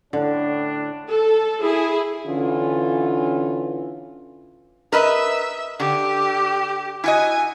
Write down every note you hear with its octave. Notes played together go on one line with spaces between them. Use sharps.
A2 D3 D4
A4
E4 G#4
D3 E3 C#4 F4
A#4 B4 D#5 E5
D3 G4
E4 F#4 D#5 G#5